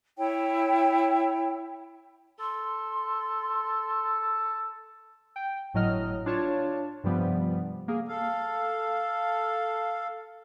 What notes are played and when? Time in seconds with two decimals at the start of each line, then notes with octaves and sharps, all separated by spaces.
0.18 E4 C#5 G5
2.40 A4 C6
5.36 G5
5.74 G1 A2 F#3 D#5 F6
6.26 D4 F4 C#5 A5
7.04 G2 C3 F3 G3 B3
7.88 A#3 G#4
8.08 A4 F5